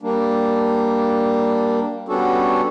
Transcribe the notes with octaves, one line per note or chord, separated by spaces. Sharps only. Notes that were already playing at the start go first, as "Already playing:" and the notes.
G3 A#3 D4
G3 B3 C#4 D4 F#4 A4